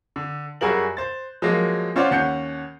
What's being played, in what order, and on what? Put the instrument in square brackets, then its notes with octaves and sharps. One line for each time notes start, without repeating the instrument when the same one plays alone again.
[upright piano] D3
F#2 G3 F#4 G#4 A#4 F#7
C5 A6
F3 F#3 G#3 A#3
C#4 F4 C5 D5 F#5
D#2 C#4 F#5 G6 C7 C#7